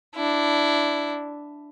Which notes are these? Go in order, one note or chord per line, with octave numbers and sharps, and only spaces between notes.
D4 E4